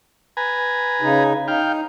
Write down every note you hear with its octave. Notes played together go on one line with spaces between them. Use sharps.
B4 G#5 A#5
C#3 D#4
D#4 F5 G5